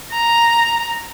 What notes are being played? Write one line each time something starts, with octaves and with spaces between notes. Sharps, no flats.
A#5